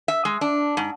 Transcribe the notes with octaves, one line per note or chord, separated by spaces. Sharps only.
E5
G#3
D4
G#2